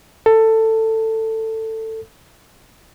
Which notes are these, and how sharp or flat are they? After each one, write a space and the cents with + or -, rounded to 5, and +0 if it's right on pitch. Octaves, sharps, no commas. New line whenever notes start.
A4 +15